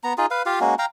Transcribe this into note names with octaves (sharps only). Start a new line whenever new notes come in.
B3 A#5
D#4 F4 G#4
B4 F5
F4 G4 F5
G#3 A#3 C#4 F#4
F5 G5 A#5